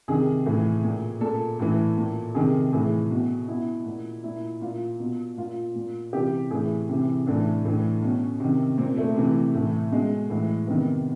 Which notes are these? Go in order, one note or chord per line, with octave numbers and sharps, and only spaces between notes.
C3 D#3 G#4
A2 E3
A#2
A#2 A4
A2 E3
A#2
C3 D#3 G#4
A2 E3 G#4
B2
B2 E4
A#2
A#2 E4
A#2 F4
B2
A#2 F4
A#2
C3 E3 G4
A2 E3 G#4
C3 E3
A2 E3 D4
A2 E3
B2 C#4
C3 D#3
A#2 C4
A3
C3 E3
A2 E3
B2 G#3
A2 E3
C3 D#3 B3